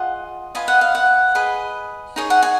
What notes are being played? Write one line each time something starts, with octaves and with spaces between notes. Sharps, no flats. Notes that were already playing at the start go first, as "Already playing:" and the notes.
Already playing: F4 G#4 D#5 F#5
F4 B4 D#5 G#5
F#5
F5
F#5
G#4 B4 D#5
D#4 G#4 C#5
F#5
G#5